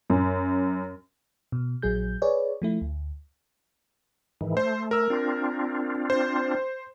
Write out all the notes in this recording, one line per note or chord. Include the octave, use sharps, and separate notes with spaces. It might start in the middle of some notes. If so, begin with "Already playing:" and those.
F#2
B2
A#1 F#3 G#4 G6
G#4 B4 C#5 D5
F3 A3 E4
D2
G#2 D#3 E3
A3 C5
A#4 E6
C4 D4 F4
C5